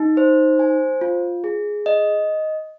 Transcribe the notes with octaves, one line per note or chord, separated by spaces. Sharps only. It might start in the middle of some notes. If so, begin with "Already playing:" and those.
Already playing: D#4
C5
G#5
F4
G#4
D#5